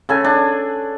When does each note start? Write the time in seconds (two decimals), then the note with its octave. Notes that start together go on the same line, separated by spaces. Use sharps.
0.09 C#3 A4 G#5
0.24 D4